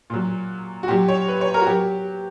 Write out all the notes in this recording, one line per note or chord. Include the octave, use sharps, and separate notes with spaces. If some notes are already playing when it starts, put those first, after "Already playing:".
A#2 F#3
F#4
A#2 F#3 G4
C#5
B4
C#5
A#4
F#4
F#3 G4